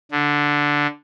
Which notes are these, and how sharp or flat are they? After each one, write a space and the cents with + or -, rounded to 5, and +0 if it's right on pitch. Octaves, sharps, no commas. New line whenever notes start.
D3 -5